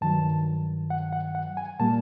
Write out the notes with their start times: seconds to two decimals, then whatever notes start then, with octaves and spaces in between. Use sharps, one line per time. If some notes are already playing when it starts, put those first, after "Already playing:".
0.01 G2 D#3 F#3 A5
0.90 F#5
1.13 F#5
1.35 F#5
1.57 G#5
1.80 A#2 G3 A#3 A5